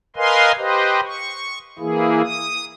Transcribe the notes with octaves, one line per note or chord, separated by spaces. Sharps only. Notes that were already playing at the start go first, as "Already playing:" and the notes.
A#4 B4 D#5 F5 G#5 C6
G4 B4 C5 D#5
C#6
E3 A#3 E4 G#4
D#6